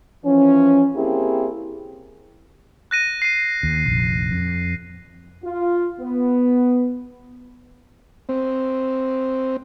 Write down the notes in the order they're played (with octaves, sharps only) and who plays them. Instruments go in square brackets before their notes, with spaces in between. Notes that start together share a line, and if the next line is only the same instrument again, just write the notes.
[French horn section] E3 F3 C#4
A#3 C4 E4 G4 G#4
[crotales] F#6 A#6 D#7
C7 D#7
[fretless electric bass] D#2
F1 A#1
F2
[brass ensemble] F4
B3
[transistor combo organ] C4